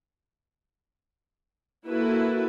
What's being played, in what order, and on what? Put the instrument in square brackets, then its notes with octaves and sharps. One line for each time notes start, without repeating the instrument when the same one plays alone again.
[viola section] A#3 E4 F#4 A4 B4